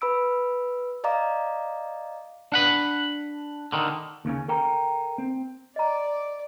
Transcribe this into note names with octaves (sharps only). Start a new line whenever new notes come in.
B4 B5 E6 D7
D5 D#5 F5 A#5 D6
D4 F#5 B5
D3 D#3
D#2 C#3 C#4
A4 A#4 G5 A#5
C4
D5 D#5 A#5